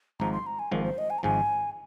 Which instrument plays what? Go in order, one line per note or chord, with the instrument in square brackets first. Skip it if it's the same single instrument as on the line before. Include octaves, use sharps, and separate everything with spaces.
[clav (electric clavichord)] G#1 G#2 F3 [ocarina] A#5
[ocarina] C6
A#5
G#5
[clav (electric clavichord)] G#1 G#2 F3 [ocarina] A#4
[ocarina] C5
D#5
G#5
A#5
[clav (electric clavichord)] G#1 G#2 F3 [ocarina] G#5